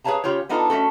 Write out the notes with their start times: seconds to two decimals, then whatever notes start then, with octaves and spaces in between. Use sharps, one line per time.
0.04 G#4 B4 C#5 F5 A5 A#5
0.24 C#3 F4 G4 C#5
0.49 B3 D4 D#4 F4 A4
0.70 A3 C#4 F#4 A4